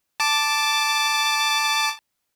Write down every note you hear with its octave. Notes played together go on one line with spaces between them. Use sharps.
A5 D6